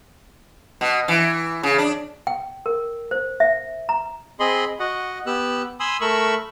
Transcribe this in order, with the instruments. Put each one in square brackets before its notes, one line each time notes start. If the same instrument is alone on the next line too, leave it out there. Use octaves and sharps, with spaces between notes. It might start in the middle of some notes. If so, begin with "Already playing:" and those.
[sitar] B2
E3
C#3
D4
[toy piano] G5
A#4
C5
E5
A#5
[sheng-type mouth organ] C4 G#4 D#5 B5 C6
F#4 D#5 F#5
B3 G4 E6 F#6
G#5 B5 C6 D#6 E6
A3 A#4 B5 C#6 E6